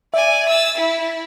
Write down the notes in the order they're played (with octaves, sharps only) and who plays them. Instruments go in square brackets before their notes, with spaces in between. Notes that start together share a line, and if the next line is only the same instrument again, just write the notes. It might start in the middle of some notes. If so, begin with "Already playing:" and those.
[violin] D5 G#5 [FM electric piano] E5
[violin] E6 A6
E4